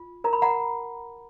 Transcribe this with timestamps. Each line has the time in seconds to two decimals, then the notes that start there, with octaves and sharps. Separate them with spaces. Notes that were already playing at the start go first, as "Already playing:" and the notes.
Already playing: F4
0.24 A#4 A#5
0.33 B5
0.42 F#5 A#5